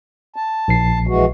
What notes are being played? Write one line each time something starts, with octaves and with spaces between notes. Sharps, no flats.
A5
A#1 C7
E3 G#3 F#4